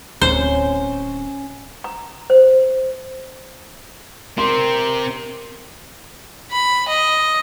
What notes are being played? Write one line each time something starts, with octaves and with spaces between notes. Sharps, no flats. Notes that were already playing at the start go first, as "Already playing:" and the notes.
D1 C4 C#4 C5
A#5
C5
C4 G4 A#4 C6
B5
D#5